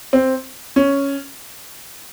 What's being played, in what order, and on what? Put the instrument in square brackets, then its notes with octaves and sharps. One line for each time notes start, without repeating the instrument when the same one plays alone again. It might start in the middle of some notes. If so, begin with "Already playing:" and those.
[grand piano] C4
C#4